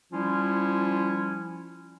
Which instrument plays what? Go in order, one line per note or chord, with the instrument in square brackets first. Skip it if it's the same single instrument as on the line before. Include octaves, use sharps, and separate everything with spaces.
[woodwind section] F3 G3 C#4 E4 F4